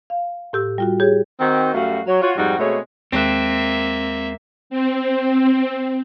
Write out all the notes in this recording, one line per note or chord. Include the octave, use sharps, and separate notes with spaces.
F5
A2 G4 E6
G3 F4 F#4
G4 G#4 C#5
D#3 C4 F#4
F#2 G3 A3 F#4 F5
F#3 C#5
F4 F#4 C#5
F2 G#2 G3 D#4 F#4 F#5
B2 G#3 A3 C4 G#4 C#5
D#2 G#3 A#3 C4 E5 F#6
C4